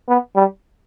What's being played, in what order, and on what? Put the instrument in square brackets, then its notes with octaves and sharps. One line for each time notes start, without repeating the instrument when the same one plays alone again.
[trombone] B3
G3